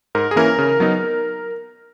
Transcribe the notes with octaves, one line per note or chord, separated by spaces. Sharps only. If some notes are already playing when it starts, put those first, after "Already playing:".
G#2 A#4
G#4
E3 A#3 C#4 E4 A#4
C#3
F#3 B3 D#4